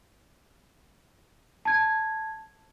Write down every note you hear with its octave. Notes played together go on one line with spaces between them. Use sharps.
A5 G#6